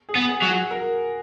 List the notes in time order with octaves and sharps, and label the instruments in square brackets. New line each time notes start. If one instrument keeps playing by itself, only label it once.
[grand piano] G#4
[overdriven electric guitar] B3
[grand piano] G#4
[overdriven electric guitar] F#3
[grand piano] F#4
A#4